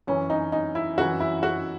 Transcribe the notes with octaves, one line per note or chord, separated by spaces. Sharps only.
F#2 E3 C#4
D#4
D#4
E4
F#2 E3 F#4
E4
F#4